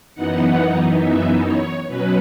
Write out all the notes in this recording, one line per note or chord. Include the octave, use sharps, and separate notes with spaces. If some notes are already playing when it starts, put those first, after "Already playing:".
F#2 E3 B3 D#4 F#5
E5
C#5
B2 F#3 C#4 B4